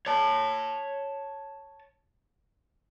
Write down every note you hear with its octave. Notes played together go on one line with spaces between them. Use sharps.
C#5 A5